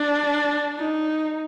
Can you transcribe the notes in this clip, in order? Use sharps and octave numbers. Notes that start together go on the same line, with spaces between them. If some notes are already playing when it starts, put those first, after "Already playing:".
Already playing: D4
D#4